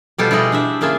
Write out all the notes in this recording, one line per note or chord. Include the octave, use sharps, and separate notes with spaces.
B2 F3 G3 F4 A4 C5
G3 E4 F4 G#4 D#5
D4 C5 E5
C#3 A#3 F4 G#4 E5